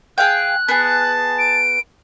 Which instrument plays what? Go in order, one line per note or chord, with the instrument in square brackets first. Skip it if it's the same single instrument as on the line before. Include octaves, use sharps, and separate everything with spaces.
[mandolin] G#4 F5 G5 [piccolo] F#6
[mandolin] B3 G#4 [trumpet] A5
[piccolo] D7